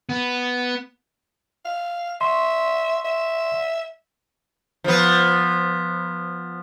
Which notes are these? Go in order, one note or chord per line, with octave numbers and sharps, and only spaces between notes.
B3
F5
E5 C6 C#6
E5
F3 B3